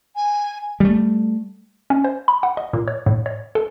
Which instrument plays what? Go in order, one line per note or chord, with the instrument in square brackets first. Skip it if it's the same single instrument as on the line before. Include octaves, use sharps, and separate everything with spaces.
[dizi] G#5
[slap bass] G3 A3
[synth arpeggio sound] C#4
C5
B5
F#5
D#5
A#2
C#5
A2
C#5
A4